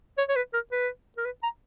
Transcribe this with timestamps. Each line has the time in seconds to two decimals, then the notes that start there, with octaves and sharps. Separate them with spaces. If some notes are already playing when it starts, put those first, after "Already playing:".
0.18 C#5
0.29 C#5
0.36 B4
0.53 A#4
0.72 B4
1.17 A#4
1.25 B4
1.43 A#5